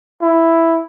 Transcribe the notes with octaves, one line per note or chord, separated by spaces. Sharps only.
E4